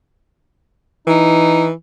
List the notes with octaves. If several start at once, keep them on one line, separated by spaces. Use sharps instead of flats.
E3 D#4